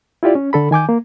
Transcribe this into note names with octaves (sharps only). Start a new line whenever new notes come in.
E4 F4 G4 D5
C#4
D3 A4 B5
D#3 G#5 D6 G6
A#3